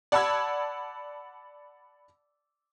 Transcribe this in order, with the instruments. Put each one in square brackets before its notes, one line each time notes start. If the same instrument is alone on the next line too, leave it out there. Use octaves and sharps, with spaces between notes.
[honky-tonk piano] D5 F#5 A5 B5 E6 G#6